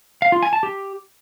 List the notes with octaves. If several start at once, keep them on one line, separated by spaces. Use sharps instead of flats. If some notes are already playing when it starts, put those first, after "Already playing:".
F5
F4
G#5
A5
G4